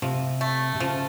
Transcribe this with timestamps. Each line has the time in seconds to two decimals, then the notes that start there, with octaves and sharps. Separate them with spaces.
0.02 C3 F3
0.41 A3
0.75 C3
0.80 C#3 F3